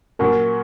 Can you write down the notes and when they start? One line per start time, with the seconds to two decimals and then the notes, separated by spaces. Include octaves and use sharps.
0.19 A#2 F#3 C#4 F#4 A#4